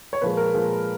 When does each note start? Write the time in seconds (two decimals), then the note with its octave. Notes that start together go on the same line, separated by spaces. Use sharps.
0.13 C#5
0.21 A#2 F3 G#3 B4
0.37 A#4
0.54 A#2 F3 G#3